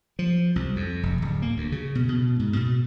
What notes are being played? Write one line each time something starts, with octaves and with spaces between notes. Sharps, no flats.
F3
C2
F2
F1
D1
A#3
D2
C#3
B2
B2
G#2
B2